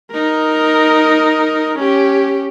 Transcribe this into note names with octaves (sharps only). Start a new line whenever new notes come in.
D#4 A#4
C#4 G4